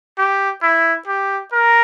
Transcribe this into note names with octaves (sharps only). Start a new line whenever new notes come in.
G4
E4
G4
A#4